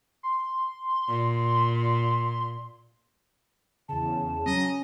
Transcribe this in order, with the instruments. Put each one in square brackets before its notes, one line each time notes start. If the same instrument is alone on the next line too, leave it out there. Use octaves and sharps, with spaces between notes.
[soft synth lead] C6
[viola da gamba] A#2
[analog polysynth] E2 C#3 [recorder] A5
[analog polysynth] F#3 A#5 [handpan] C#4 [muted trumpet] D#5